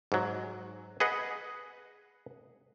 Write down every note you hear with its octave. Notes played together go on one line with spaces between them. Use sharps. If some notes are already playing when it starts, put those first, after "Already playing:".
G#2 F#3
G#4 B4 D#5 F#5